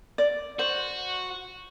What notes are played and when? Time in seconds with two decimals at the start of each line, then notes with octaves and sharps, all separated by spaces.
0.18 D5
0.59 F#4 C5